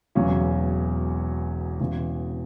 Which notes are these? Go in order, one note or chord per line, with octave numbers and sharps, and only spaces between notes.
E1 E2 C#3 F#3 C#4
E1 E2 C#3 E3